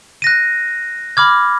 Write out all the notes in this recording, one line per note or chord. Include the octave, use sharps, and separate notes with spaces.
F#6 A#6 D#7
B5 D6 F6 G#6